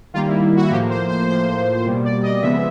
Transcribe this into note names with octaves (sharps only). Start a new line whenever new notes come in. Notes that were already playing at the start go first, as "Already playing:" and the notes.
D#3 G3 A#3 F4
E4
F#4
A2 F3 A#3 G4
C5
C5
A2 F3 A#3 C5
B2 G3 A#3
D5
D#5
C#3 F3 G#3 B3 E5